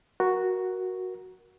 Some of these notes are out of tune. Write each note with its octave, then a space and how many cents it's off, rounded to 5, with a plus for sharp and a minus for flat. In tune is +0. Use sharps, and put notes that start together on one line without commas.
F#4 +0 A#4 +15